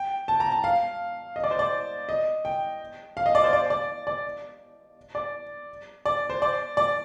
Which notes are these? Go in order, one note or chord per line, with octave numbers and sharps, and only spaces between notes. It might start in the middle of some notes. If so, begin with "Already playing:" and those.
Already playing: G5
A5
A#5
A5
F5
D#5
D5
C5
D5
D#5
G5
F5
D#5
D5
C5
D5
D5
D5
D5
D5
C5
D5
D5